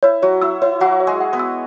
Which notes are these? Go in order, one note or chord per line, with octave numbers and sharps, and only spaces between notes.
E4 C#5
F#3 F#4 C#5
E4 E6
E4 C#5
F#3 F#4 F#5
C#5
G#3 G#4
F#5
B3 B4
E6